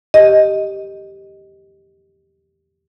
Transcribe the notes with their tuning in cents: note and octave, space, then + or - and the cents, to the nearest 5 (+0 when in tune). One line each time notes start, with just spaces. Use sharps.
G4 +0 D#5 +0